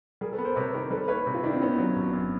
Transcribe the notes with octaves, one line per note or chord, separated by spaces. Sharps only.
G3 G#4 A#4
A4 B4
B3
A#4 C5
C3 B4 C#5
D#3 A#4 C5
G3 A4 B4
A#3 B4 C#5
C3
F4 G4
D#3 D4 E4
C4
D#3 B3 C#4
F#3
G#1
F#2